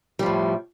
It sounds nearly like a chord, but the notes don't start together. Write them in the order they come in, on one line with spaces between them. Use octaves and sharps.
G3 F3 A2